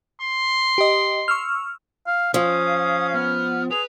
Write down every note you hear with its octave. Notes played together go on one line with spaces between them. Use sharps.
C6
G4 D#5
C#6 E6 F6
F5
F3 C#4 F5 D#6
B3 F6
G#4 B4 F7